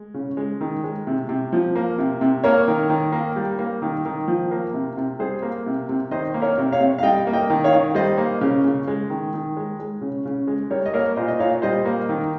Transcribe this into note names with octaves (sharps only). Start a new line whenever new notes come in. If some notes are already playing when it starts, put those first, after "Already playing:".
Already playing: G#3
C#3
G#3
D#3
G#3
C3
C3
F3
A#3
C3
C3
A#3 A#4 C#5
D#3
D#3
A#3
G3
A#3
D#3
D#3
F3
A#3
C3
C3
G3 G#4 C5
A#3
C3
C3
D#3 C5 D#5
A#3
A#4 C#5
C3
C#5 F5
C3
F5
G3 D#5 G5
A#3
D#5 G5
D#3
C#5 F5
D#3
G3 C5 D#5
A#3
C#3
C#3
G#3
D#3
D#3
G#3
G#3
C#3
C#3
G#3
G3 A#4 C#5
D#5
A#3 A#4 C#5
A#2 C5 D#5
D#5
A#2 C#5 F5
G3 C5 D#5
A#3
D#3